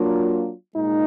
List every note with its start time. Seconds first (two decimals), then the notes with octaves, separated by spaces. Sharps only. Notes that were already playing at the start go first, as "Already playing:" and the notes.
Already playing: F#3 A#3 D4 F4
0.75 A#2 G#3 D#4